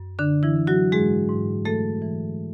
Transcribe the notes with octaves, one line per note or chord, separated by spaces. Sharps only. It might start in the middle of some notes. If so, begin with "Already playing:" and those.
Already playing: F#2
D3 D4
E3 E4
D3
F#3 F#4
G#2 G#3 G#4
G#2
E3 A3 A4
E3